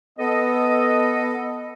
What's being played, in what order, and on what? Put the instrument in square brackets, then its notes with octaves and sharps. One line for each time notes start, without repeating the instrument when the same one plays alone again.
[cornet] B3 [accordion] A4 [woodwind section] D#5